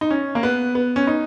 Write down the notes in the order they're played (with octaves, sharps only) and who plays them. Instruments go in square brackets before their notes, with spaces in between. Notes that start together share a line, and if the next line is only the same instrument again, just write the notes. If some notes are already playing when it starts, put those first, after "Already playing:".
[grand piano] D#4
C#4
A#3
B3
B3
C#4
D#4